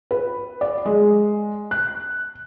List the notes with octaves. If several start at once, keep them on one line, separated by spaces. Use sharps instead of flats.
B4
D5
G#3
F#6